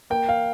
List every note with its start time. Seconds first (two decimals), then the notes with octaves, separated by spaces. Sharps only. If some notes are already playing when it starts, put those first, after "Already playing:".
0.10 A#3 G5
0.29 F5